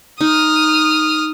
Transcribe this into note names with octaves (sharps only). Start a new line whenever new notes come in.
D#4 D#6 F6